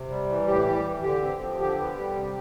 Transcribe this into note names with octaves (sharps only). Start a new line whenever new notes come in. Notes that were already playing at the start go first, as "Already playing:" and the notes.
Already playing: C3
G3
E3
A2 G4
G3
E3
D3 G4
C4
F3
D3 G4
B3
G3
C3